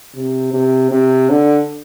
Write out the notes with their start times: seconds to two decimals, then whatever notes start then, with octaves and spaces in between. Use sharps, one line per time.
0.16 C3
0.53 C3
0.91 C3
1.29 D3